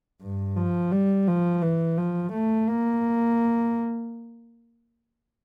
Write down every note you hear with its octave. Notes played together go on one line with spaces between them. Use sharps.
G2
F3
G3
F3
E3
F3
A3
A#3